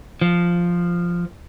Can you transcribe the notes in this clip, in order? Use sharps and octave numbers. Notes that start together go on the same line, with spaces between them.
F3